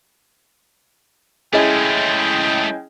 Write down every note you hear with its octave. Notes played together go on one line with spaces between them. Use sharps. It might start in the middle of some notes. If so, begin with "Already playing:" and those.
G#3 A3 C#4 E4 G#4 D#5 G5